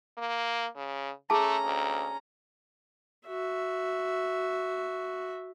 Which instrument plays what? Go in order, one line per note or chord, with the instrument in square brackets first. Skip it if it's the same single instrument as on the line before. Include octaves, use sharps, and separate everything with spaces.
[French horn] A#3
C#3
[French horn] A3 [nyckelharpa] C#4 A#5 [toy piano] G#4 A5
[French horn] D2
[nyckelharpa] F#4 E5